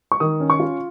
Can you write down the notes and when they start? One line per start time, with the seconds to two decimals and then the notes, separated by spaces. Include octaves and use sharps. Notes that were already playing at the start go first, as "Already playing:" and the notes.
0.12 C#6
0.20 D#3 D#6
0.40 C#4
0.50 C#6
0.59 F4